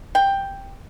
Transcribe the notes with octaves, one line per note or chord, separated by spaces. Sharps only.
G5